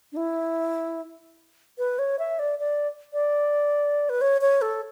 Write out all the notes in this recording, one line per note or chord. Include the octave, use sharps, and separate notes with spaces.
D4
E4
B4
C#5
E5
D5
D5
D5
B4
C#5
C#5
A4